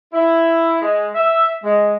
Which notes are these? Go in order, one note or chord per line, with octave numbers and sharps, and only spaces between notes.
E4
G#3
E5
G#3